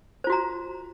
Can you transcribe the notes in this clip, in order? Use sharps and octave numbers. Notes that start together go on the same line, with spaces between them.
F4 F#4 C5 A#5